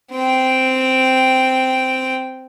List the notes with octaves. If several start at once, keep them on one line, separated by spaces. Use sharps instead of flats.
C4 G5